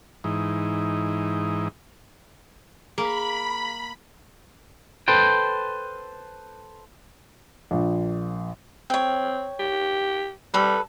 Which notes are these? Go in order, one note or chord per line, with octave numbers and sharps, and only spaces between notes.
G#2 E3 D#4
A#3 G#4 F5 A#5 B5
A4 B4 C5 G5
A#1 F3
C4 C#5 G5
G4
G3 A4 B4